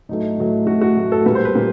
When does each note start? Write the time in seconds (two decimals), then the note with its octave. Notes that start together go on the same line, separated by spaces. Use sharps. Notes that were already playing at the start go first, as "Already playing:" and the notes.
0.09 A2 F#3 A3 D#4
0.37 A2 F#3 A3
0.67 A2 F#3 A3 F#4
0.81 F#4
0.97 A2 F#3 A3
1.12 A4
1.26 A#2 G3 B4
1.35 C5
1.45 B4
1.55 A#2 G3